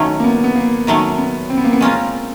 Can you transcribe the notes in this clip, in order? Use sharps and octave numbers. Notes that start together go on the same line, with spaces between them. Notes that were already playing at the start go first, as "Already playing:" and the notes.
Already playing: D#3 F#3 A3 C#4
A#3
B3
B3
A#3
D#3 F#3 A3 C#4
B3
C4
B3
A#3
B3
G#3 C4 C#4 F4 A#4